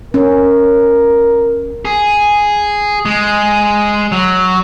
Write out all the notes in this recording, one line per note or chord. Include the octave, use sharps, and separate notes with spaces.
C#4 A#4
G#4
G#3
F#3